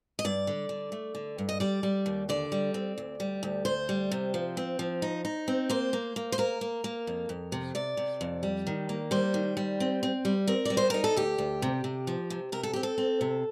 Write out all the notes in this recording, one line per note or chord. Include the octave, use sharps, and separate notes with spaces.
D#5
G2 D5
D3
D3
A3
D3
G2
D#5
G3 D5
G3
D#2
D3 D5
G3
C4
D2
G3
D2
D2 C5
G3
C3
F3
C4
F3
D#4
D#4
C4
A#3 C5
A#3
A#3
C5
A#3 A#4
A#3
A#3
F2
F2
C3
C3 D5
C3
F2
G3
D#3
A#3
G3 C5
D#3
G3
C4
C4
G3
C4 A#4
G3 D5
C5
D#4 A#4
A4
D2 G4
D2
C3
C3
F3
C3
C3 A#4
A4
C4 G4
A4
C4
C3